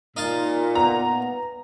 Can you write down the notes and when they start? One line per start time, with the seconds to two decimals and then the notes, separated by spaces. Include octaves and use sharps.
0.17 A#2 D#4 F5 A5
0.75 B3 A#5